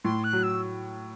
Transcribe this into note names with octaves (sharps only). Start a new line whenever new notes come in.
A2 C6
F#6
F#3
E6